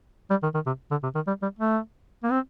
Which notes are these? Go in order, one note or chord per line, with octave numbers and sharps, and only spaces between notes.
G3
D#3
D#3
C3
D3
C3
D#3
G3
G3
A3
A#3
C4